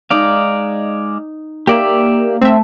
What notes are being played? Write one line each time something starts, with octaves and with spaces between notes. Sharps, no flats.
G#3 D#4 D5 F5
A#3 G4 D5 E5
A3 C4 E5